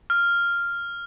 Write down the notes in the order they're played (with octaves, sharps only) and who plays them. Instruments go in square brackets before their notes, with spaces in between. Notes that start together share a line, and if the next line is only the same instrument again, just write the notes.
[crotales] F6